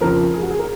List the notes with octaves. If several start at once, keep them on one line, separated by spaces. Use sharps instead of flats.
F2 C#3 F3 A#4
G#4
F#4
G#4
A#4